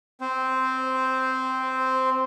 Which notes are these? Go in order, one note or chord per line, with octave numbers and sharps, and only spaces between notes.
C4 C5